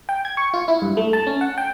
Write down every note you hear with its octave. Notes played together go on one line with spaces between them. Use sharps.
G5
G#6
C#6
F4
E4
G2
A3
A5
C#4
F#5
G5